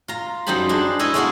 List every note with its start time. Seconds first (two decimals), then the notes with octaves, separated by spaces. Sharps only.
0.08 F4 A#5
0.47 F#2 G3 D#4 C5 A5 B5
0.69 G#3 D4
0.99 E4 A4 C#5 D#5
1.14 G#3 B3 E4 F#4 D5 F5